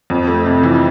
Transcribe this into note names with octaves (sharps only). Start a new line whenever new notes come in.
F2
A3
C3
E3